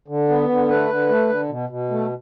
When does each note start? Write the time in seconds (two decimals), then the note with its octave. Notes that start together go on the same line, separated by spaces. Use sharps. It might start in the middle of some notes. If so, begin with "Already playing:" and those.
0.08 D3
0.29 B3
0.49 D3
0.69 A3 B4
0.90 D3
1.09 A3
1.29 D3
1.49 B2
1.69 B2
1.90 A3